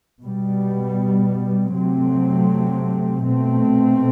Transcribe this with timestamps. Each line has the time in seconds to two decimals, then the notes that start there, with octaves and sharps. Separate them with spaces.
0.21 B2 G3 B3
1.73 C3 F#3 A3 C4
3.25 B2 A3 C4